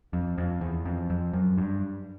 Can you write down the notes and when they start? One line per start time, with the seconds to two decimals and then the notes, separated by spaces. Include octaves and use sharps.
0.13 F2
0.38 F2
0.61 E2
0.86 F2
1.10 F2
1.34 F#2
1.58 G2